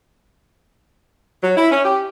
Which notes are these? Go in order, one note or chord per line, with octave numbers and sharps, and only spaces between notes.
F#3
E4
C#4
G4